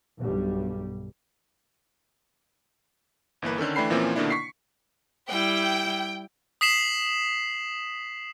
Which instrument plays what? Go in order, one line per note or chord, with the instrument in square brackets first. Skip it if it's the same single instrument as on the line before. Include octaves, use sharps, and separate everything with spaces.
[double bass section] B1 G2 B2 G3
[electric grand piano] G1 E3 A#3 B4
D3 D#3 C#4 A4
E3 A3 D4 G5 B5 C7
A#2 E3 F3 A#3 C4 C#4
B2 D3 D#3 A#3 D4 E4
C#6 B6 C7
[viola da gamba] G3 E4 [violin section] G5
[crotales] D#6 B6 C7 E7 F#7